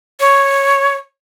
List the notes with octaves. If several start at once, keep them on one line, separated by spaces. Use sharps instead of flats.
C#5